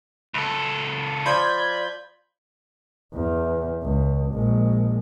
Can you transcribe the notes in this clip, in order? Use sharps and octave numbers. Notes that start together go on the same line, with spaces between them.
C#2 A4
F3 F4 D5 B5 G6 G#6
E2 E3
C#2
A#1 G#3